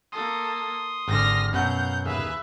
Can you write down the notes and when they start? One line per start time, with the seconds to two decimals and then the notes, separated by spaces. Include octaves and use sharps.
0.12 A#3 A4 C6 D#6
1.08 G#1 D3 F6 A#6
1.53 F#2 B2 F#3 F5 F#5 G6
2.05 D#2 G#4 B4 E5 F5